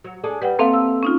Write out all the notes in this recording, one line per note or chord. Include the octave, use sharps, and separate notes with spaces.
F#3
D4 G#4 A4
G3 B4 F#5 G5
A#3 C4 A4 E5 F5
E6
C#4 D#4 F4